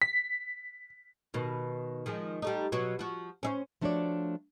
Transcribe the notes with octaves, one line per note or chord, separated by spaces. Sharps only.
B6
B2 D#3
D#3 F3 G#3
G3 A3 D#4
B2 F#3 F#4
F3 F#4
C#4 E4 C5
F3 A3 D4 F#4 C#5 D5